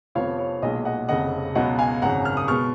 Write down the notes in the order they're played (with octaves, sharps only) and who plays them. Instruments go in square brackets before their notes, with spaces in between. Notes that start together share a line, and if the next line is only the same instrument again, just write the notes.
[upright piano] F1 F2 F3 B3 C#5 F5
C#5
B1 A#2 G#3 D#5
D#5 F#5
F1 F2 C#3 D#5 F#5
C#2 B2 F#3 B3 D#5 F#5
F5 G#5
G#1 F#2 C#3 F#5 A#5
F6
D#6
B2 G#3 C#6 F6